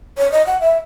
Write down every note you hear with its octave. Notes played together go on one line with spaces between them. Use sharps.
C#5
D#5
F#5
E5